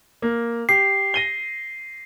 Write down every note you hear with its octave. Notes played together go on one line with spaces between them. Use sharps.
A#3
G4 C7
A#6 D#7 G7